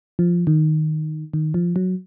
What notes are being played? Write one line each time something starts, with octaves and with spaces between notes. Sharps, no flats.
F3
D#3
D#3
F3
F#3